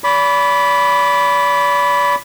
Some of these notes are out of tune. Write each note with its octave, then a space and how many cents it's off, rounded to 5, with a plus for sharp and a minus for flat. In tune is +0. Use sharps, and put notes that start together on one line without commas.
D5 -40 B5 +0 D6 +0